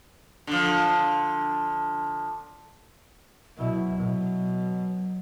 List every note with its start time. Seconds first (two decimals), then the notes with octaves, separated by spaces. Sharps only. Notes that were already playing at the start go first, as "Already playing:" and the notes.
0.47 D3 F3
3.58 B2 F#3 E4
4.00 B2